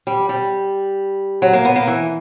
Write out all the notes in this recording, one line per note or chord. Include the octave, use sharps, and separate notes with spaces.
G3
G3
F#3
A#3
B3
A#3
E3